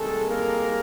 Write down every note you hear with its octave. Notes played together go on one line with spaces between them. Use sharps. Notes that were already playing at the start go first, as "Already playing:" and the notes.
Already playing: C2 C3 D#3 G#3 A3 A4
A#3 A#4